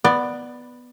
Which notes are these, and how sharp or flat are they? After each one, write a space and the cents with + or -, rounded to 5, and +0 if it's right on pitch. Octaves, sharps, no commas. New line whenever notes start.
B3 +0 D5 +15